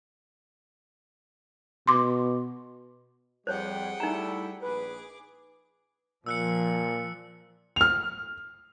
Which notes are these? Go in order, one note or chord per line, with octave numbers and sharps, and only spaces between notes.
B2 C6 D6
F2 G3 G#4 C5 C#5 F#5 G5
G3 A3 D#4 E4 A#5
A#1 G#4 B4 D6
A#2 F3 E6 F#6 C#7
F6 F7